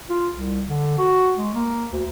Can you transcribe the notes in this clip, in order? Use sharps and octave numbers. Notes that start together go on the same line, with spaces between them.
F4
C2
D3
F#4
G#3
A#3
D2